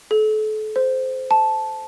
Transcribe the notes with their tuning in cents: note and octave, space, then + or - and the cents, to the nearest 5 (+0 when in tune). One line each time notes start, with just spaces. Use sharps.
A4 -35
C5 -10
A5 -10